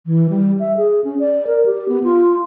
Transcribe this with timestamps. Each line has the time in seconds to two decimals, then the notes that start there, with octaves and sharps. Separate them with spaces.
0.06 E3
0.30 G3
0.60 E5
0.77 G#4
1.04 C#4
1.19 D5
1.47 A#4
1.66 G4
1.89 B3
2.04 F4